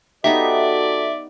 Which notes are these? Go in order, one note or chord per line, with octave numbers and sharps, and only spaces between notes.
B3 D#4 F#4 G4 A4 D5 E5